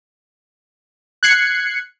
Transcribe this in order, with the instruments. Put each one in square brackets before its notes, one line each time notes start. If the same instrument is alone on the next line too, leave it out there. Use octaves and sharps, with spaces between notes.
[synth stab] F#6 G#6 C7 C#7